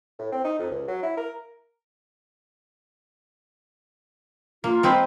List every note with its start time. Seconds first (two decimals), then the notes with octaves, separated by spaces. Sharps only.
0.19 A2
0.32 C4
0.45 D#4
0.59 F2
0.71 C#2
0.88 F#3
1.03 E4
1.17 A#4
4.64 A#3 F4
4.83 G#3 C4 B4